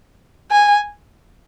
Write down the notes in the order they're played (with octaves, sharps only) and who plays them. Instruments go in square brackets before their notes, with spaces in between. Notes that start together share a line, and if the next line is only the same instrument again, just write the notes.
[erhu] G#5